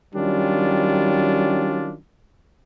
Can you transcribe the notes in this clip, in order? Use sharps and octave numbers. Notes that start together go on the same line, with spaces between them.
D#3 F#3 G3 C#4 D4 F4